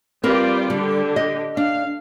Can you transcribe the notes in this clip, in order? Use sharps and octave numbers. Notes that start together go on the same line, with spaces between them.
G3 C4 F4 A#4 B4 D5
D3 G3 G4
D#5
D4 F5